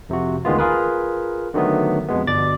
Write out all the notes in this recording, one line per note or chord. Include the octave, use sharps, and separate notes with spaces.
F2 C3 F3 F#4
D2 D#3 G#3 B3 F4
F4 G#4 A#4 B4
D3 D#3 F#3 A3 B3
F2 B2 G#3 B3
G1 B2 D5 D6 A6